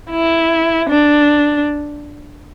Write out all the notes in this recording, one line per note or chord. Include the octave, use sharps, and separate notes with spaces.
E4
D4